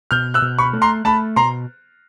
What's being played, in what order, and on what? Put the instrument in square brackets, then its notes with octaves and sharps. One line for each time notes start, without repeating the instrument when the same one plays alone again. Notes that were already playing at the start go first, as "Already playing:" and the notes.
[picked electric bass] B2 [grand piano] F6 G6
[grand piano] E6 F#6
[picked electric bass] B2
[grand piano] B5 C#6
[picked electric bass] A3
[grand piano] A#5 C6
[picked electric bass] A3 [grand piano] A5 B5
[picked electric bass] B2 [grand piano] A#5 C6